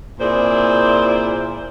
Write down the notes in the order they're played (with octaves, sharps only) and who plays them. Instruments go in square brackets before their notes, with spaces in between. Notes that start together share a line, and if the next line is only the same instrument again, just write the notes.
[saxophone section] A#2 C4 E4 G#4 C5 D5